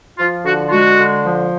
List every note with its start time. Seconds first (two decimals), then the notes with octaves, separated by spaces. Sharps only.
0.18 F3 F4
0.45 D3 F#4
0.68 F4
0.72 G#3 F#4
0.99 D3
1.26 F3